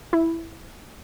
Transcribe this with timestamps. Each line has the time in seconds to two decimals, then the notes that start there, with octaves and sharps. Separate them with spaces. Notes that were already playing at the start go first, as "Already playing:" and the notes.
0.13 E4